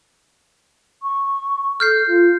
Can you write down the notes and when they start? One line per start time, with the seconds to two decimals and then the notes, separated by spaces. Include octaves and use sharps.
1.02 C#6
1.80 A4 F6 G6 C7
2.07 F4